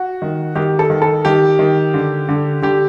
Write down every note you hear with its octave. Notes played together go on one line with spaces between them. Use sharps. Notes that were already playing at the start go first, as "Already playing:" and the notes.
Already playing: F#4
D#3
D#3 G4
A4
D#3
A4
D#3 G4
D#3
D3
D3
D3 G4